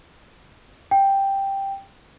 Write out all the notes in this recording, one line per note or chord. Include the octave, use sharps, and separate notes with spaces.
G5